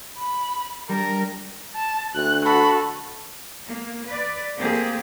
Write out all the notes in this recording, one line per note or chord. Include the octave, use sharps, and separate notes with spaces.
B5
G3 D4 A#4
A5
D2 F#6
F#4 A4 B5
A#3
B4 D5
A3 A#3 C4 G4 G#4